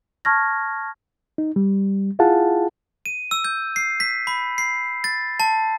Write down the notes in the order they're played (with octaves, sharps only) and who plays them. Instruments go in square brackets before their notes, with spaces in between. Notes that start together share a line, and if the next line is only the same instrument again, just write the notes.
[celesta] A5 C#6 F6 G#6 A#6
[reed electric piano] D#4
G3
E4 F4 G#4 F5 F#5 A5
[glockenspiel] D#7
E6
G6
C7
B6
B5
C7
A6
A5